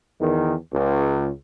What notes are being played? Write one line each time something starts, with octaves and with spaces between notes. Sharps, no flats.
E2 D#3
C#2